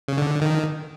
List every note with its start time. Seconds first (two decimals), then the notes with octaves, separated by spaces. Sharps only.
0.08 C#3
0.18 D3
0.41 D#3